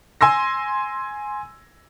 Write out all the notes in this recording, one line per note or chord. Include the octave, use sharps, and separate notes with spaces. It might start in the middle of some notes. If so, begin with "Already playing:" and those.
G#5 C6 E6 A#6